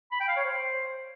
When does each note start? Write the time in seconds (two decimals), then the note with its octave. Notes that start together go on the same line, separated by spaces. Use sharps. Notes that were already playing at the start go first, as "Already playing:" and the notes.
0.12 B5
0.20 G5
0.28 F5
0.36 C#5
0.45 C5